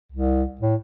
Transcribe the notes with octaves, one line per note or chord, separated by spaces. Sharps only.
C2
A2